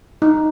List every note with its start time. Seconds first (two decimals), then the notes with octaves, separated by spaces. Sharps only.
0.22 D#4